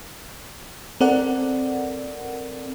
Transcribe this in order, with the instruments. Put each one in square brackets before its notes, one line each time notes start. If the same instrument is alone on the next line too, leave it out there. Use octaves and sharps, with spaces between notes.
[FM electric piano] C4 A4 A#4 D5 F#5